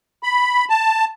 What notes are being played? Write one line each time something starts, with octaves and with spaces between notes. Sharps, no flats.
B5
A5